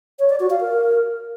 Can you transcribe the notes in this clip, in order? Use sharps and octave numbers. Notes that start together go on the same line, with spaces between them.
C#5
D5
F#4
F5
A#4